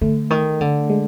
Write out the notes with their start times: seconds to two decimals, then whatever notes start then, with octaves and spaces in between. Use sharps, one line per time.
0.01 D3 A3
0.30 D#3
0.61 D3
0.90 G#3